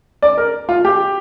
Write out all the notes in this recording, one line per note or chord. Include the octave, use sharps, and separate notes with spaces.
D5
A#4
F4
G4